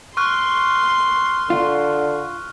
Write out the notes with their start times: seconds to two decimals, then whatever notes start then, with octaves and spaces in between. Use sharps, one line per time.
0.17 C6 C#6 F6 F#6
1.50 D3 F4